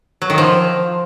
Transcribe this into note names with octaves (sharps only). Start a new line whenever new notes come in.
F#3
D#3
F3